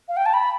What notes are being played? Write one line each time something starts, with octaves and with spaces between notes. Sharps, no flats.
F5
G5
A5
B5